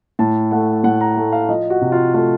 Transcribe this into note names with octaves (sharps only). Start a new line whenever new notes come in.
A2 A5
A3 F#5
A2 F#5
A#5
A3
F5
F3 D#5
F#4
C3
F4
A3 F4